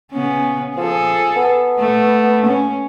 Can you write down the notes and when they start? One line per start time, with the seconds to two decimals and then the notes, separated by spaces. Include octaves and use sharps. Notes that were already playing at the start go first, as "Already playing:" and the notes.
0.13 C#3 B3 C#4
0.77 F3 G#4 A4
1.36 B3
1.80 A3
2.46 C#4